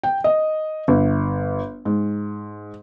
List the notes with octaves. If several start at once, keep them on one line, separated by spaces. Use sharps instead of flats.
G5
D#5
G1
G#2